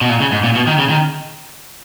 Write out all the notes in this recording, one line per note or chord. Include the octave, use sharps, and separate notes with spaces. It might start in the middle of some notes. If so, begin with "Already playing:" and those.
B2
A#2
C#3
G#2
A#2
B2
D#3
C#3
D#3